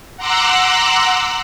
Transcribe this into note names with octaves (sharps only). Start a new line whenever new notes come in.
F#5 A#5 C6 D6 E6 F#6